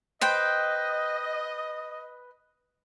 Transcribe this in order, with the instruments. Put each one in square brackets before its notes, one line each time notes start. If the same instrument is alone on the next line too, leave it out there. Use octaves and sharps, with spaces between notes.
[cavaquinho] B4 C5 G5 [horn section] D#5